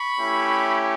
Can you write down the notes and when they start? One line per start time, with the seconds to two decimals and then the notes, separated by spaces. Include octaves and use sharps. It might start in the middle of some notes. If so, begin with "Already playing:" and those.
Already playing: B5 C#6
0.18 A3 C#4 E4 G4